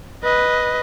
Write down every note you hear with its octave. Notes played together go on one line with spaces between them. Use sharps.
B4 D#5